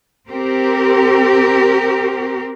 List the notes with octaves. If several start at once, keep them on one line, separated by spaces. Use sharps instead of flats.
C4 G4 A#4